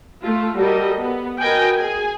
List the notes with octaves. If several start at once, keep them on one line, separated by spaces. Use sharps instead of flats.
A3 F4
G3 F#4 A4 A#4 D#5
B3
F#4 A#4 B4 D#5 G5 G#5
G#4 G#5